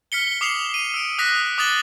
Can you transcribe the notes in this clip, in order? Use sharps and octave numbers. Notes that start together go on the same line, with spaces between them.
F6 B6 C#7 G7
D6 D#6 C7 C#7 F7 F#7
D#7
E6 D7
D6 D#6 F#6 A#6 B6
D6 D#6 F#6 A6 F#7 G7